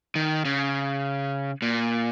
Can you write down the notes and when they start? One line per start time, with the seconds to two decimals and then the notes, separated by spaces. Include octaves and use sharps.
0.15 D#3
0.45 C#3
1.62 A#2